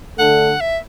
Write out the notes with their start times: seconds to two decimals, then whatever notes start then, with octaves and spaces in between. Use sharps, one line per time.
0.18 D3 A3 D4 A4 F#5
0.61 E5